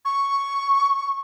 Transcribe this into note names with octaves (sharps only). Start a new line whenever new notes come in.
C#6